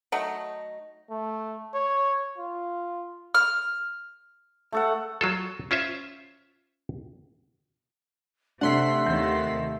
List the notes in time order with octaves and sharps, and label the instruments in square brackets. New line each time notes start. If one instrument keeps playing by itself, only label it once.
[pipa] F#3 A3 D#4
[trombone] A3
C#5
F4
[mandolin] F6
[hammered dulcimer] A3 A4 F#5
[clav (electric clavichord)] F#3 F4 A4
C#4 F4 C5 E5
[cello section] C3 [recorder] A3 [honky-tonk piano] D4 [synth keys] F#5 C6 B6
[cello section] D#2 C3 D#3 [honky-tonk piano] G6